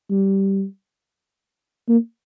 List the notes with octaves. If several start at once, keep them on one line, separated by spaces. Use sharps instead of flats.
G3
A#3